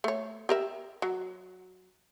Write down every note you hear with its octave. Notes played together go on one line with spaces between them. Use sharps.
A3 C#5
G4 A#4 E5
F#3